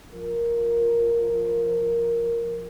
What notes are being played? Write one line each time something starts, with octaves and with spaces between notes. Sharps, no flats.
F3 A#4